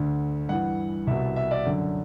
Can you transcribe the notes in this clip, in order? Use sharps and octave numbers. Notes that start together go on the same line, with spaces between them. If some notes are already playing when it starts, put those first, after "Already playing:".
Already playing: D2 D3
G2 E3 F#5
C2 B2 E5
E5
D5
F#2 D3